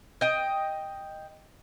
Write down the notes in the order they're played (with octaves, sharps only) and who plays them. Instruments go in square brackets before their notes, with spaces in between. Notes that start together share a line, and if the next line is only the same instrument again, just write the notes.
[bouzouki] D#5 G5